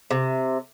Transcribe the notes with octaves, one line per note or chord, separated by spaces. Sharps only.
C3